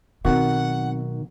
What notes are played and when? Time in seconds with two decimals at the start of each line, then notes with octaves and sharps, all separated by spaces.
0.25 B1 D#3 C4 F#4 F#5